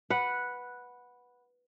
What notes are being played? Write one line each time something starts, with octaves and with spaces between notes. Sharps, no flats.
B4 F#5